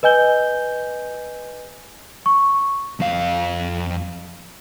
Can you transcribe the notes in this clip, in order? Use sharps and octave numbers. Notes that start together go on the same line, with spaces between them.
B4 D#5 G#5 G6 G7
C#6
F2 F5